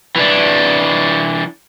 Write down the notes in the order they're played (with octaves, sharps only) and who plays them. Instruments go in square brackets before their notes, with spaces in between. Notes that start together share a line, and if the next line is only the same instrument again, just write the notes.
[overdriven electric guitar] E3 D4